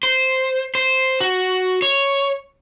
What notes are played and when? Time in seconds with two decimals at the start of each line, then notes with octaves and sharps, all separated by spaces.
0.03 C5
0.75 C5
1.21 F#4
1.82 C#5